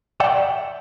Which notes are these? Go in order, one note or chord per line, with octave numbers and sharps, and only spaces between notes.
D5 E5 F#5 G5